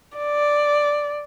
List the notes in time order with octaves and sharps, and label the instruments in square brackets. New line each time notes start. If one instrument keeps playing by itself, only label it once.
[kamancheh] D5